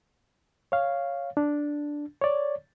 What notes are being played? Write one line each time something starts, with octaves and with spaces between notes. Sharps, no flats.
C#5 F5
D4
C#5 D5